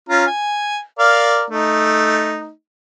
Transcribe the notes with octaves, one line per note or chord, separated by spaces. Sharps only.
C#4 F4 A#5
G#5
A#4 D5 F5
A3 D#4